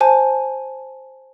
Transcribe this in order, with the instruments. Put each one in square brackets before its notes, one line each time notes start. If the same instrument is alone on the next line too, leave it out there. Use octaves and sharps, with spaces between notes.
[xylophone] C5 G#5 A5